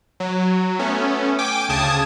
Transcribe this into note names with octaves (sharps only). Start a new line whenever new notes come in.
F#3
A3 B3 C#4
G5 G#5 D6 D7
D2 C#3 A5 D#6 G#6